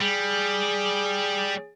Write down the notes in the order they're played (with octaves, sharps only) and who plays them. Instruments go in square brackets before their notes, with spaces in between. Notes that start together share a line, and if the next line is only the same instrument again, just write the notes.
[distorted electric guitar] G3 [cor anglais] G#4